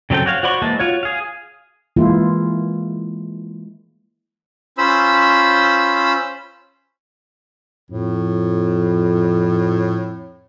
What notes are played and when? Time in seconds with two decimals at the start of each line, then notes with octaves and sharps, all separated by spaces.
0.10 C#3 F#3 C4 A4 G5
0.26 F#4 C#5 F5
0.43 F#4 C5 D5 B5 C#6
0.62 E3 G#3 A#3 A5
0.79 F4 F#4 C#5
1.03 G#4 F5
1.96 E3 G#3 A#3 E4 F4
4.78 C#4 F4 C5 B5 E6
7.91 F2 A2